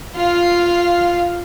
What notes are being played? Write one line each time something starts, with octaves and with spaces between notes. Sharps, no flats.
F4 F5